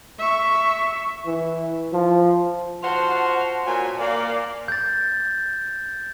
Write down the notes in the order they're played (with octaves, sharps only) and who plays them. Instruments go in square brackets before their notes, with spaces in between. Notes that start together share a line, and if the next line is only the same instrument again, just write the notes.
[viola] E5 C#6
[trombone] E3
F3
[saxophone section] F4 F#4 C5 [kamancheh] F#5 A5
[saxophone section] A#2 F#3 [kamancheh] G#5
[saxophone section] A#2 A#3 [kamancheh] D5
[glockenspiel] G6 A6